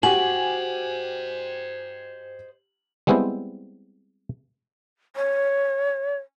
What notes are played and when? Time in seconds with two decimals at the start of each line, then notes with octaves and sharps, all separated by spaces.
0.03 F#4 G4 C5 D#5 G#5 F#7
3.07 G3 G#3 B3 C4 E4 C5
5.16 C#5